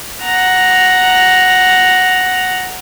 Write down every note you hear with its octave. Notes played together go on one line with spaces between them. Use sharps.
F#5 A#5